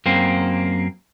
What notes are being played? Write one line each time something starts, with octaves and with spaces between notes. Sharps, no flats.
F#2 A#3 C4